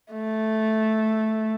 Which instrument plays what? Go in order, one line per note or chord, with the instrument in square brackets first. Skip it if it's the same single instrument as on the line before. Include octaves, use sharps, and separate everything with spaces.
[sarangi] A3